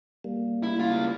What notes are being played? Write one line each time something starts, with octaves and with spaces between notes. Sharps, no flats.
G3 A#3
E4
C#2 F4